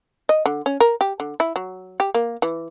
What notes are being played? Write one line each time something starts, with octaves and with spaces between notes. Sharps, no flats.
D#5
D3
C#4
A#4
G4
D3
E4
F#3
G4
A#3
E3